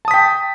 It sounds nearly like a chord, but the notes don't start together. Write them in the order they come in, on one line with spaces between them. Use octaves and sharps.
A5 D#6 B6 G5